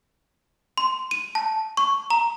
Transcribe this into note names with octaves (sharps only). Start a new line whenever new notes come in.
C6
D#7
A5
C#6
A#5